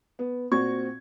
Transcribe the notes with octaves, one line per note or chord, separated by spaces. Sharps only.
B3
A#2 C4 F#4 C#6 G#6